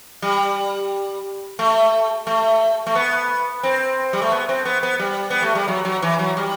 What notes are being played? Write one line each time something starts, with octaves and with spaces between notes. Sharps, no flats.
G3
A3
A3
A3
B3
C4
G3
A3
B3
C4
B3
B3
G3
B3
A3
G3
F#3
F#3
E3
F#3
G3